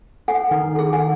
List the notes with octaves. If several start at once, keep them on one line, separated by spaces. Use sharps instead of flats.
A4 F#5 G#5
D#3
G#4 A4
F#5 G#5